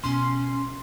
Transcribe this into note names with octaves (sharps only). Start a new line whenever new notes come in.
B2 C#4 F4 C6